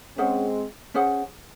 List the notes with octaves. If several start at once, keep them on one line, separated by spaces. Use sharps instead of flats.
G#3 C4 C#4 G#4 C5 F#5
C#4 G#4 C5 F#5